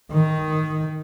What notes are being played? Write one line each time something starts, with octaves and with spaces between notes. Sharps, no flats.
D#3